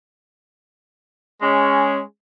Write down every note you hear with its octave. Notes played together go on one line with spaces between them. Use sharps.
G#3 C#4